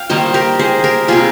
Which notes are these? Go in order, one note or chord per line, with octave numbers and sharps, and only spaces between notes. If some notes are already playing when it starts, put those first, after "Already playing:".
Already playing: F5 G5
D#3 G3 A#3 C5 D#5
G4 A#4
G#4 C5
G4 A#4
C3 G3 A#3 F4 G#4